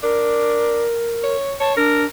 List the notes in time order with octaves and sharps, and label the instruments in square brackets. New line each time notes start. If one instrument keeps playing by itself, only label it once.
[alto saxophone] D4 [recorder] A#4
[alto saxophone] C#5
[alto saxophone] C#5 [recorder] A5
[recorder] D4 [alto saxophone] A#4